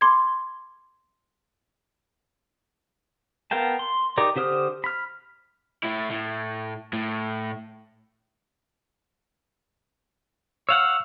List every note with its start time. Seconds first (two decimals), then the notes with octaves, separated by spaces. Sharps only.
0.01 B5 C6 D6 G#6
3.51 B3 A#4 F5 G5 A5
3.79 C6
4.18 D#4 G4 A#4 D5
4.36 D3 G4 C5 D#6 F6
4.84 B5 F6
5.84 A2 E4
6.11 A2
6.93 A2
10.69 C#5 F5 F#5 E6